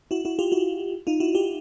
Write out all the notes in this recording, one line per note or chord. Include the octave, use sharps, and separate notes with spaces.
E4 F#4
E4 F#4
F4 G4
E4 F#4
D#4 F4
E4 F#4
F4 G4